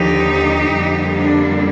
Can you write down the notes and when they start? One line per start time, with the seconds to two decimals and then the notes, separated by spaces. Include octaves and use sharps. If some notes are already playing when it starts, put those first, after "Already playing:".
Already playing: D#2 D3 F3 D#4 G4
0.74 F2 D3 G3 A#3
1.16 D4